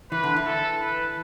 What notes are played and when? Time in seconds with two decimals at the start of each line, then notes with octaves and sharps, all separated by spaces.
0.11 E3 B4
0.24 D3
0.36 E3
0.46 A4
0.81 B4